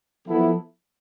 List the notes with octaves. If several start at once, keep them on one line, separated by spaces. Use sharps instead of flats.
F3 B3 E4 A4